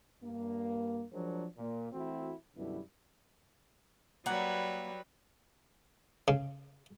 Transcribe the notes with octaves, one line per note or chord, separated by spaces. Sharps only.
G2 A#3
F3 F#3 G#3 D4 A#4 C5
A#2
E3 A3 C4 E4 F#4
F#2 B2 D3 G3 B3 E4
F#3 G3 A#3 B4 F#5
C#3